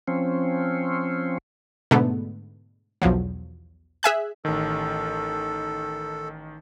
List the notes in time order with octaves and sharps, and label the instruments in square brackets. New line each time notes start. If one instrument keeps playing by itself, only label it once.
[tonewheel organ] F3 C4 C#4
[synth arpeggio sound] G#2 B2 D3 A3 B3
B1 E2 F3 F#3
G#4 E5 G#5 F#6
[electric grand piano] A1 D#3 [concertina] A4